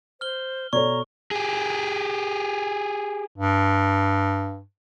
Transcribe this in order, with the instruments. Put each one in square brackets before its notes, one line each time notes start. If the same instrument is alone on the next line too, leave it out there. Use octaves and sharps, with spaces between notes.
[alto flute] C5 [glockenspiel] F6 G7
[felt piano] B2 A4 C#5 [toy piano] D5 [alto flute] A#5 [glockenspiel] C#6
[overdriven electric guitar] G4 G#4
[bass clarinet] G2